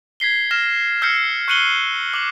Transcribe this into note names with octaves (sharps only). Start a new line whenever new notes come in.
G#6 B6 C7 G7
F6 A#6 E7
E6 F6 G6 A#6 C7 C#7
C#6 F#6 C#7 D#7 F#7 G7
D6 F#7